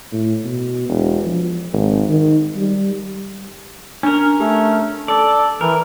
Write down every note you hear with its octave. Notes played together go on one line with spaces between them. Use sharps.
A2
B2
E1
F3
G#1
D#3
G3
C#4 D4 A#4
A3 G4
A4 D5
E3 A#4